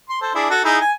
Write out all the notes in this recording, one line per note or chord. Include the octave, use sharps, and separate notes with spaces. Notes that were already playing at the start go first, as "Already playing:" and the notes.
C6
A4 C5
D4 E4 G#4
F#4 A4
D#4 E4 G#4
G#5